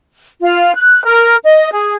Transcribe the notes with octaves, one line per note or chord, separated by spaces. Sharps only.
F4
F#6
A#4
D#5
G#4